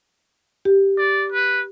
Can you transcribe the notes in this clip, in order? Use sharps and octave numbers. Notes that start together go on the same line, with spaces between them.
G4
D5
B4